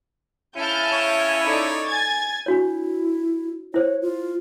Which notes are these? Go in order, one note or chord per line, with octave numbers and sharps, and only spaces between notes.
C#3 C#4 E4 A5 F6 G6
C#5
D#4 A4 D5
G#5 G#6 A6
D4 E4 F#4 C#5
E4 C5 C#5
F4